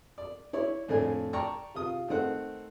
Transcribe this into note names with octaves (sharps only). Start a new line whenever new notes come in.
D5
E4 C#5 D5
F2 A2 A3 C4 D4 G#5
D5 G5 A5 A#5 C#6
C3 F4 D#6
D#3 A3 C4 F#5